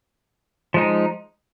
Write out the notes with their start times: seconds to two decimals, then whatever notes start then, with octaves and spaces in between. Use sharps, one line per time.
0.74 F3 G#3 D#4